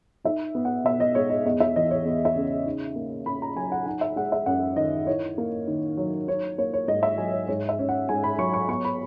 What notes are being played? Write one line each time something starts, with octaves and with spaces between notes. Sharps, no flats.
D#4 E5
B3
F#5
B2 E5
D#5
G#3 C#5
D#5
E2 D#5
E5
E3 D#5
C#5
E2
E5
C#3
D#4
A#3
C#3 B5
A#5
F#3 G#5
F#5
D#4 F#5
E5
G#3 F#5
E5
F#2 F#5
D#3 D#5
E4 C#5
A#3
D#3
F#3
D#4 C#5
A#3 C#5
C#5
G#2 D#5
E5
F#3 G#5
C#5
G#2 C#5
E5
C#4
F#5
G#2 G#5
B5
F#3 C#6
C#6
B3 C#6
B5